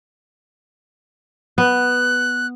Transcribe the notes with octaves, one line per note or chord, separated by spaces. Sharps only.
B3 F#6